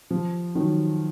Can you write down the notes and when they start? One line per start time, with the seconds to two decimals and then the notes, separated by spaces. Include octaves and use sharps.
0.11 F3
0.55 D#3 F#3